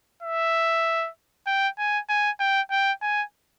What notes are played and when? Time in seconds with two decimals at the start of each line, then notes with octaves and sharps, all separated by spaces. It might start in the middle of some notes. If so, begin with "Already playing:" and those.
0.23 E5
1.47 G5
1.78 G#5
2.09 G#5
2.40 G5
2.71 G5
3.02 G#5